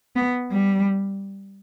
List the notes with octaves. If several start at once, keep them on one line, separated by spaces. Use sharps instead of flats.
B3
G3